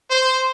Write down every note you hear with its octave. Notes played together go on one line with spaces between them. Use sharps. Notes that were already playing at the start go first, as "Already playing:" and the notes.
C5